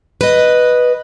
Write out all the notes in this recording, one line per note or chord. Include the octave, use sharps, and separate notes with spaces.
B4 D#5